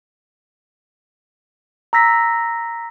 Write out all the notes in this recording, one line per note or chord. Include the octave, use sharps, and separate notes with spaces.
A#5 E6 A#6 B6